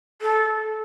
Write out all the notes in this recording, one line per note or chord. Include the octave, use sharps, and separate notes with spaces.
A4